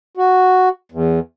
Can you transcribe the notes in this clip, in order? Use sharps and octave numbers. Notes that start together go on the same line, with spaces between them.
F#4
E2